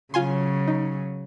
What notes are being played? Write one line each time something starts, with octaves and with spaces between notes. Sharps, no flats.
C#3 F#3 F4 G#5 C6
D#4